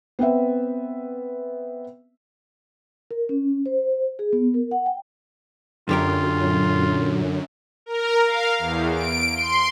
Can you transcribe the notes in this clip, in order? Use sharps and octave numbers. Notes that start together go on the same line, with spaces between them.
B3 C4 B4 E5
A#4
C#4
C5
G#4
B3
A#4
F#5
G5
F#2 D3 F4 G4 A#4
A#2 F#3
A#4
F5
E2
D7
C6